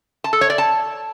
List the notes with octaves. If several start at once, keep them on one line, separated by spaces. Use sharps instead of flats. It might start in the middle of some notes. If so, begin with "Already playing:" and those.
A5
A4
C#5
D5
A5